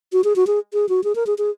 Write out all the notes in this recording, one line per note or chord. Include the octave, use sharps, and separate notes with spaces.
F#4
G#4
F#4
G#4
G#4
F#4
G#4
A#4
G#4
G#4